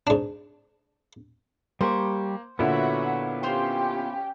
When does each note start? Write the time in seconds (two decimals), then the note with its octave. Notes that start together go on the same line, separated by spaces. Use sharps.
0.07 G#2 D4
1.81 G3 A#3 G4 C5 C#6
2.59 A#2 D3 B3 E4 F#4 C#5 E5 F#5
3.43 C#4 F4 G4 C5 C6